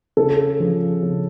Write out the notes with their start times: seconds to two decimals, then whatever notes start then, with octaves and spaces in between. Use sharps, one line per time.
0.17 C#3 A4
0.60 F3
1.03 C#3